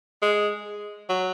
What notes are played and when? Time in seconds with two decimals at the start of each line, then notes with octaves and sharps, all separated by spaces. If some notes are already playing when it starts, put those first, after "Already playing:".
0.22 G#3
1.09 F#3